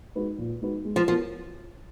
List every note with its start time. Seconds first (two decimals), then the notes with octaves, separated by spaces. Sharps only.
0.15 G#3 D#4 F#4 B4
0.38 A#2
0.62 G#3 D#4 F#4 B4
0.85 G#3
0.96 F3
1.08 F3 B3 F#4 A#4